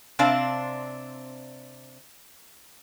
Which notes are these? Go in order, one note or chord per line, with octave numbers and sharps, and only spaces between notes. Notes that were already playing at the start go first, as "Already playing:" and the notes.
C3 C4 D4 D5 F5 A5